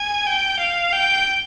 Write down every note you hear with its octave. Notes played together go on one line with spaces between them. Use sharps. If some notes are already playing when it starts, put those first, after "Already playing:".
Already playing: G#5
G5
F5
G5